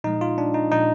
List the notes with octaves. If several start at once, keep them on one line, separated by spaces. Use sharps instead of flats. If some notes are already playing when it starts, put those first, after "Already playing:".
A#2 F3 G#3 D#4
F4
D4
D#4
A#2 F3 G#3 D#4